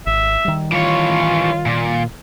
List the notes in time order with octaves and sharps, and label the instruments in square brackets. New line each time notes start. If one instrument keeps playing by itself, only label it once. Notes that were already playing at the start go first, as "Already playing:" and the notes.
[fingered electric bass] G#1 [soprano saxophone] E5
[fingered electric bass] D#3 G3
[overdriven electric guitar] E3 C#5 [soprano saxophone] F4
[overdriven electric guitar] A#2